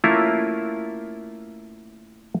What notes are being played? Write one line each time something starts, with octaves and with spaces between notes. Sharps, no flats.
A3 A#3 C#4 E4 F4 A#4